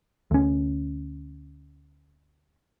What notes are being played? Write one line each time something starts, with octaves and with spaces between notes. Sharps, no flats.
D2 C#4